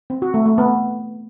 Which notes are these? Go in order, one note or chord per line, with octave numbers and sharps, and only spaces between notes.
C4
F#4
A3
A3
B3